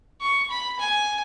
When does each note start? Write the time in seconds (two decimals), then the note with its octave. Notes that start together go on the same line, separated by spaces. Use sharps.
0.21 C#6
0.50 B5
0.79 G#5